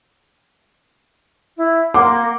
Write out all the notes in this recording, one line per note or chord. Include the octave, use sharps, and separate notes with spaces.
E4
A#3 F#5 C6 D6